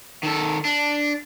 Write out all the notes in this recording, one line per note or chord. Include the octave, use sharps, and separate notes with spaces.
D#3 A4
D4